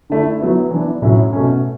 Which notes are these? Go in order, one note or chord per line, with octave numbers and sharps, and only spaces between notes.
D3 A3 E4
F#3 B3 E4
E3 B3 D4
A2 F#3 C#4 E4
B2 A3 C#4